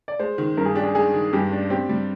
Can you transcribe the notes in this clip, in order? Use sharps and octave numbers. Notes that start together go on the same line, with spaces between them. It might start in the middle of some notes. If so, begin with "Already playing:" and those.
D5
G#3 C5
D#3
G2 A#4
G#4
D4 G4
G#4
G#3 G#4
D#3
G2 G4
D4
C4 G4
G3